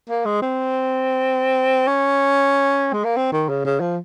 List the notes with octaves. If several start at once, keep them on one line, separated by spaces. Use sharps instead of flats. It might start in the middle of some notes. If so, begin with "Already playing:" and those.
A#3
G#3
C4
C#4
G#3
A#3
C4
D#3
C#3
C#3
F3